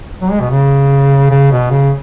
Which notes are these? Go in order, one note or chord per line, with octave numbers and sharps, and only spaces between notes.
F#3
G#3
B2
C#3
C#3
B2
C#3